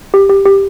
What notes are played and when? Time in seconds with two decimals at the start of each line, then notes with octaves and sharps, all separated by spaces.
0.14 G4
0.29 G4
0.46 G4